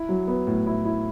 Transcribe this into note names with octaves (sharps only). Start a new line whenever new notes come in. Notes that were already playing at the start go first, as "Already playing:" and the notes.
Already playing: E4
F#3
B3
A2
E4
E4